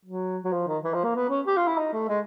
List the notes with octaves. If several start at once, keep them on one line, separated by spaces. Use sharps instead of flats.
F#3
F#3
F3
D#3
E3
F3
A#3
B3
C#4
G4
F4
E4
D#4
A3
G#3